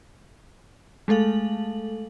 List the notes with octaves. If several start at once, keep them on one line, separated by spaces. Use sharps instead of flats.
G#3 A3 A4 F5 F#7